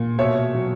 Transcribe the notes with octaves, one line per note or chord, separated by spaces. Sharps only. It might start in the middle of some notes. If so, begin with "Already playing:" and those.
Already playing: A#2
B2 C#5 E5
F#3